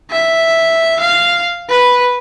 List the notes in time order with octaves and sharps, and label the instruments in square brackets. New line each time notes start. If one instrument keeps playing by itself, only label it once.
[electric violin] E5
F5
B4